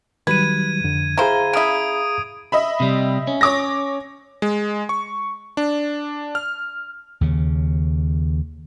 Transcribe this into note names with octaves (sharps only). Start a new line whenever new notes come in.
D#3 F#3 G3 B4 G#6 D#7
F2 D3
E4 G#4 C5 F5 A#5
C#3 E4 D#6 D7
D#5 E5 B5
C3 G3
C#4
C#5 D6 A#6
G#3
C#6
D4
F6
D#2 C#3